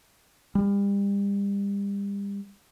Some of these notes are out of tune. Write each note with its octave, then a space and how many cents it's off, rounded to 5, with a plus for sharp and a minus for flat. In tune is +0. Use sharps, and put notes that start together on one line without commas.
G3 +35